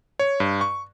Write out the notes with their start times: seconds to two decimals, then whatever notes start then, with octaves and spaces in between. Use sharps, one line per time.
0.19 C#5
0.40 G2
0.61 C#6